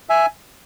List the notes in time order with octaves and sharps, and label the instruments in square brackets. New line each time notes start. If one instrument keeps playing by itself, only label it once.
[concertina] E5 G#5